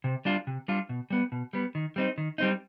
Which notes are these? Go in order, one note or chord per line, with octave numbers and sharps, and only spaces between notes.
C3
G3 D4 F4
C3
G3 D4 F4
B2
G3 B3
B2
G3 B3
D#3
G3 C4 D#4
D#3
G3 C4 D#4